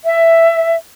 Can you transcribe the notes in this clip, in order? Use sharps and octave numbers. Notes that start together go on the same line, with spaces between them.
E5